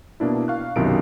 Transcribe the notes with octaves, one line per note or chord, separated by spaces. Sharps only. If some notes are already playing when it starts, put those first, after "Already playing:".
B2 A#3 D4 E4
F5 C#6 F#6
B1 F#2 C3 D#3 E4 D7